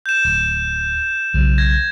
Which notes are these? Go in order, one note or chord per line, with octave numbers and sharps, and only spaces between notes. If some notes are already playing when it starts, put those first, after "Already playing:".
G6 E7
D1
B1 C#3 F#3
G#6 A#6